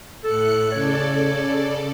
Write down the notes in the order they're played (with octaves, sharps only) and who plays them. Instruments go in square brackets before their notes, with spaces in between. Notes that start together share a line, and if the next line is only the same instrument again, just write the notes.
[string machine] A2 F#6 C#7 [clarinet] A4
[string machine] C#3 A4 D5 [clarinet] C#5